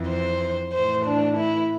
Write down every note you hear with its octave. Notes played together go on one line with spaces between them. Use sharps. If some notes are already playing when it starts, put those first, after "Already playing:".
Already playing: F2 E3
C5
A2 E3 C5
D4
E4